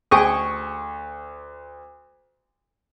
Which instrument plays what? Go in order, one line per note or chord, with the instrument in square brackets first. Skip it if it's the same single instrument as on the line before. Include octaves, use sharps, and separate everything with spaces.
[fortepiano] D2 C#6 [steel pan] G#4 G5 D#6